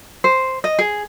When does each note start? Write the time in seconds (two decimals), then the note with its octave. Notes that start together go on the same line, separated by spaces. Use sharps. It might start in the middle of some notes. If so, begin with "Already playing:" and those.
0.24 C5
0.64 D#5
0.79 G#4